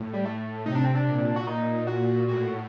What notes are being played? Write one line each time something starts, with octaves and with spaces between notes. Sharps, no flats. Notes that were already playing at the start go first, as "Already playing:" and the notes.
Already playing: A2
G3
A3
C3 D#4
D4
C4
D4
A#2
F#4
D#4
F#4
A2 F#4